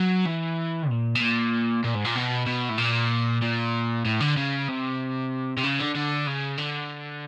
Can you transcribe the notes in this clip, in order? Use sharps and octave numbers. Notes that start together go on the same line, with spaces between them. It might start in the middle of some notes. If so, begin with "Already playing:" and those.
Already playing: F#3
E3
A#2
B2
A#2
A#2
G#2
A#2
B2
B2
A2
A#2
A#2
A2
D3
C#3
C3
C3
C#3
D3
D3
C#3
D3